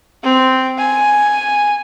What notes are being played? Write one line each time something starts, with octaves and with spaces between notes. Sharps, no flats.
C4
G#5